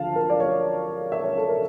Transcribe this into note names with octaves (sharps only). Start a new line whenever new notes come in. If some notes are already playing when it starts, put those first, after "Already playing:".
Already playing: D2 D3 F3 F5 A5
A#4
D5
C#5
E5
C#5
A4
A#4